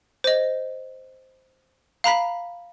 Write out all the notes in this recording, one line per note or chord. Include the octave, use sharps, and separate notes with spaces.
C5 D#5
F5 A#5 B5 B6